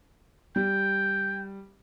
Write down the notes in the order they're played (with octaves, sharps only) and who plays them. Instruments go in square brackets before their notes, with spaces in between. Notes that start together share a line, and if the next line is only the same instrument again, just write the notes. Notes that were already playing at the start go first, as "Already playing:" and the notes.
[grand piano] G3 [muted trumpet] G5